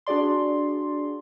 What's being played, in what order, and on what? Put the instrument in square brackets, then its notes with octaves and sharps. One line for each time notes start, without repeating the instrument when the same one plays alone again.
[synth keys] D4 F#4 G#4 D5 C6